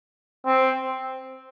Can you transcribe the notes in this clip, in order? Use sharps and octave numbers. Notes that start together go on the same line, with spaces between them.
C4